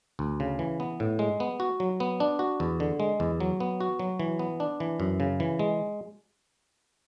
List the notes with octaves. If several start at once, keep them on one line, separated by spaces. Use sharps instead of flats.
D2
C#3
E3
B3
A2
G#3
B3
F#4
F#3
B3
D4
F#4
E2
D3
G#3
E2
F#3
B3
F#4
F#3
E3
B3
D4
E3
F#2
C#3
E3
G#3